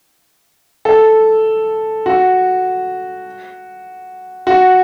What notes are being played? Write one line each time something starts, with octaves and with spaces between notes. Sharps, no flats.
A4
F#4
F#4